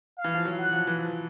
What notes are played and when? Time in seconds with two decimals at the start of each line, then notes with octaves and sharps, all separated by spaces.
0.18 F5
0.24 E3
0.34 F3
0.45 F#3
0.59 F#5
0.72 F3
0.87 E3
0.99 F3